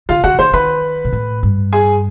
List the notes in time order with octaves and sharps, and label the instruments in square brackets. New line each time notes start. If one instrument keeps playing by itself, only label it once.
[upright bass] D3 [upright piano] F4 F5
[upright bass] D3 [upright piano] F#4 F#5
[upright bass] D#3 [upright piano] C5 C6
[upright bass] D#3 [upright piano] B4 B5
[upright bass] A#2
A2
G2
[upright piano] G#4 G#5